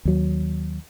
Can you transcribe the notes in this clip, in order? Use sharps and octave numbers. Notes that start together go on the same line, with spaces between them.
D#2 F#3